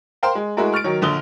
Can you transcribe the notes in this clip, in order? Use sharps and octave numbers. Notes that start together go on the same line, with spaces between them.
A#4 C5 F5 G5 C6
G#3
G#3 A3 E4 F#4 A#4
C#6 F6 A6 D7
D#3 F#3 C#5
A#1 D3 D#6 G7